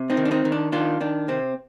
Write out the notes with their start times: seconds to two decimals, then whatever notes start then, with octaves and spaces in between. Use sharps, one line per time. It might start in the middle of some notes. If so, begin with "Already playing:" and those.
Already playing: C3
0.10 C4 D#4
0.17 D#3
0.25 D4
0.31 C4 D#4
0.45 D#3
0.52 D4
0.72 D#3 D4 F4
1.01 D#3 D4
1.28 C3 C4